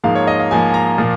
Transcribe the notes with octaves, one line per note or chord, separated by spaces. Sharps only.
G#2 F3 A#3 F5
C#5
D#5
F5
G#2 F3 A#3 G#5
G#5
A#5
A#2 F3 A#3